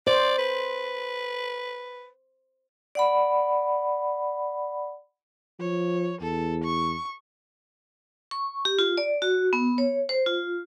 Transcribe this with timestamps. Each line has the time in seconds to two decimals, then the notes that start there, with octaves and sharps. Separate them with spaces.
0.07 C5 D5
0.38 B4
2.95 D5 F#5 B5
5.60 F3 C#5
6.21 E2 A4
6.64 C#6
8.31 C#6
8.65 G4
8.79 F4
8.98 D5
9.22 F#4
9.53 B3
9.78 C#5
10.09 C5
10.26 F4